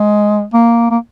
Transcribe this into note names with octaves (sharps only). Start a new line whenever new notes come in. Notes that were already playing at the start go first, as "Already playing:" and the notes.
Already playing: G#3
A#3
A#3